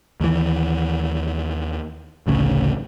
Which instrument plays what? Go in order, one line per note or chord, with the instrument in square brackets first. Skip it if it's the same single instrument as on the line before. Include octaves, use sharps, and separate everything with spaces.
[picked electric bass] D#2 E3
A1 D2 C#3